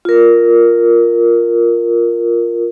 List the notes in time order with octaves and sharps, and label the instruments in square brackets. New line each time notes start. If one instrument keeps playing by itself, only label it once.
[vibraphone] F4 A#4